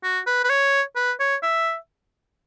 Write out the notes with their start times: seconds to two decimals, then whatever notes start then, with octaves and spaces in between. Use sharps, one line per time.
0.04 F#4
0.27 B4
0.44 B4
0.50 C#5
0.96 B4
1.20 C#5
1.43 E5